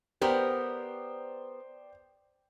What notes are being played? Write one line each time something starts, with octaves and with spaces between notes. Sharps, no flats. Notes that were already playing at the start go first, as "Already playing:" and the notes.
B3 G4 A#4 C5 D5 G5